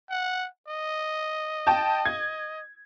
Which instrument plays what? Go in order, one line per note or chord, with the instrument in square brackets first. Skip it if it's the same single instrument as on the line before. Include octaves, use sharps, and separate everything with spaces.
[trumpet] F#5
D#5
[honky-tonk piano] G5 A5
G#6